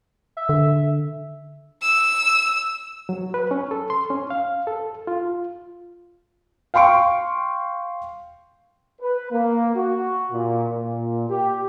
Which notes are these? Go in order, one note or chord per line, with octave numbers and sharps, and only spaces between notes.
E5
D3
E6
F#3
B4
C#4
A4
C6
C#4
F5
A4
F4
F5 G5 C6 C#6 D7
B4
A#3
F#4
A#2
A#2
G4